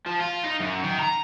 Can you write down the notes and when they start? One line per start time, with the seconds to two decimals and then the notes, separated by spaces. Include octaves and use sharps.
0.06 F3
0.20 F4
0.44 D#4
0.61 F#2
0.84 D#3
0.99 A#5